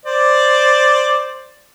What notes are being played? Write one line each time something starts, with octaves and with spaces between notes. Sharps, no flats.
C5 D5